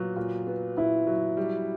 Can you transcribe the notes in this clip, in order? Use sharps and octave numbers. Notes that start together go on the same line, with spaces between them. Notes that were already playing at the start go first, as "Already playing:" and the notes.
Already playing: A#2 F#3 B3
A#2
B3
A#2 E4
F#3
G3